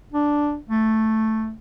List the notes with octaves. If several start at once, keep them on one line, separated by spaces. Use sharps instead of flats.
D4
A3